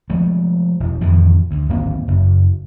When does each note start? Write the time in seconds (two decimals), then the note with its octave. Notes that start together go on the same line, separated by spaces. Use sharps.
0.10 F3 G#3 A3
0.80 E1
1.01 F2 A2 D#3 E3
1.51 D2
1.69 D1 G#1 A#3 C4
2.08 F#1